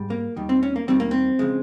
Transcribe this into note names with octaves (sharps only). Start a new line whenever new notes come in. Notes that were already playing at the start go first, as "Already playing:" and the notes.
Already playing: G#2 G3
A#3
D#2 D#3 G3
C4
C#4
A#3
D#2 D#3 G3 C4
A#3
C4
C#3 F3 G#3